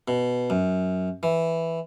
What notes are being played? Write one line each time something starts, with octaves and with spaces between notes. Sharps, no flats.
B2
F#2
E3